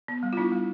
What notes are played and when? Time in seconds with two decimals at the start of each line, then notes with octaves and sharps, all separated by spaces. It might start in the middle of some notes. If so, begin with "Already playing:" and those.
0.08 B3
0.23 G3
0.33 F4
0.37 B3 D4 E4
0.52 G3